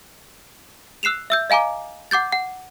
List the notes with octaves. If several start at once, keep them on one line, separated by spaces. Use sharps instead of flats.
E6 F#6 C7 E7 F7
E5 E6 G6
D#5 F5 G#5 A#5 D6
F#5 D6 G6 A6
F#5